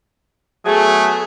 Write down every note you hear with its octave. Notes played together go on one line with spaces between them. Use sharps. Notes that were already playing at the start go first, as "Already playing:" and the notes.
F#3 A3 B3 G#4